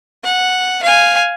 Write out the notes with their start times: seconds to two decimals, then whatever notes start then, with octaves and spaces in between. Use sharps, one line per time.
0.24 F#5
0.83 F5 G#5